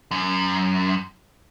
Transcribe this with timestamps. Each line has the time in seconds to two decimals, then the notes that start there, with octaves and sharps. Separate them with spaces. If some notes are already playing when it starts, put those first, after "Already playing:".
0.11 F#2